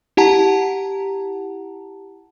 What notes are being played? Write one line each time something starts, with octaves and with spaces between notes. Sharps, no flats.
E4 G4 F#5 A5 A#5